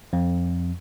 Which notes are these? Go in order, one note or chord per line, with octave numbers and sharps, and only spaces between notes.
F2